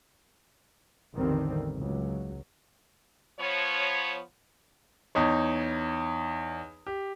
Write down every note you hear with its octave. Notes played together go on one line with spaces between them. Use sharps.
A1 E2 D3 D#3 G3 C4
C#2 F#3
F3 B3 C#5
E2 D#4 C#5
G4